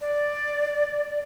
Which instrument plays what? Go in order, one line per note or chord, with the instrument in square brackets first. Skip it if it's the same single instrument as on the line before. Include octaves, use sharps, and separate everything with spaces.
[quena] D5